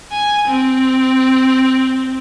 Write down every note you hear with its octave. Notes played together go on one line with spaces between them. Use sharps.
G#5
C4